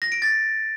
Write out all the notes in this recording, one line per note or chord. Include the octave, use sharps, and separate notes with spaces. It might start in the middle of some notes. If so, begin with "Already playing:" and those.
A#6
D7
A6